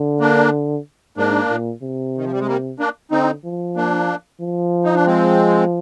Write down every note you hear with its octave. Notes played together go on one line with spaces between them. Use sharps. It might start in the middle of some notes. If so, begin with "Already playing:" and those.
Already playing: D3
A#3 D4
G#2 A#3 D4
A#2
C3
D#3
F3
G3
G#3
G3 A#3
A#3 D4
D3 C4 D#4
F3
A#3 D4
F3
D#4
D4
G#3 C4